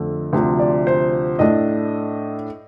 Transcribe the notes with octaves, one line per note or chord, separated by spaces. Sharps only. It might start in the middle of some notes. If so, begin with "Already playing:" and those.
Already playing: F2 D3 A3
D2 C3 F3
D5
C5
A2 A3 D4 D#5